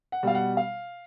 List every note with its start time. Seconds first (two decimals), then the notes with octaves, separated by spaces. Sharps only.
0.12 F#5
0.23 B2 G3 F5
0.35 F#5
0.57 F5